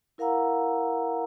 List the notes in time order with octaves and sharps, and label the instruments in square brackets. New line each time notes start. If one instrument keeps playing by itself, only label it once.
[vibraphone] E4 A#4 F5 F#5 A#5 E6